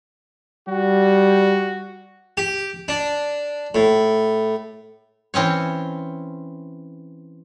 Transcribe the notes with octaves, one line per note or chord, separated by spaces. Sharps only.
G3 F#4
G4
D4
A2
E3 C4 C#4 C#5